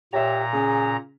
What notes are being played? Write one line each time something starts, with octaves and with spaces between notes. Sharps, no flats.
A#2 G4 C#5 E5 A#5
C#3 G#4